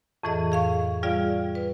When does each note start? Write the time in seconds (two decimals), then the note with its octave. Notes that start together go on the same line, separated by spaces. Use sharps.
0.23 F2 A2 E3 G#4 D#5
0.52 G#4 F5 C#6
1.03 G3 F4 G#4 D5 F5
1.55 B4